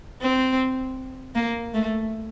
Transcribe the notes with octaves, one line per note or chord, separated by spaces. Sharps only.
C4
A#3
A3